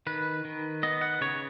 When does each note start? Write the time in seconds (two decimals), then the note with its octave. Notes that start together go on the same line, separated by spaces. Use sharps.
0.07 D#3 B4
0.45 D#3
0.83 B3 D#5
1.01 F#5
1.21 C#3 C#5